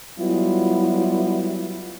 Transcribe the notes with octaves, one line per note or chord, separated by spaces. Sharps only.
F#3 G3 B3 E4 F4